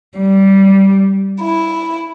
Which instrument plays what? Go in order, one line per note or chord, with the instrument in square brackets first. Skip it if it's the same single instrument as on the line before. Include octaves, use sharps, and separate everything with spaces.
[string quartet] G3
E4